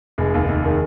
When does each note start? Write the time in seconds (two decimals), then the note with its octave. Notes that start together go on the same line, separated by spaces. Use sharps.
0.18 F1 G#3
0.34 D#2
0.49 F1
0.65 D#3 G#3